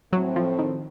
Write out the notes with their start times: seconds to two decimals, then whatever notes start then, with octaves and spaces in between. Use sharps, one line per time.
0.13 A2 F#3 A3 C4
0.36 F3
0.59 D#3